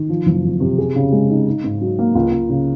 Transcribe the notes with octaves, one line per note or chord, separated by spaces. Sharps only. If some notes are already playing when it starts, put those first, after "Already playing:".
Already playing: D#3
F3
F#1
F2
C3
G#4
C#3
G#3
D#4
D#4
G#2
F#3
A#3
C#2
C#2
C#3